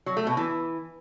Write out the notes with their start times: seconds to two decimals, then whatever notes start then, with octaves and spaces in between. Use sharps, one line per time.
0.06 F#3
0.17 A3
0.27 B2
0.37 E3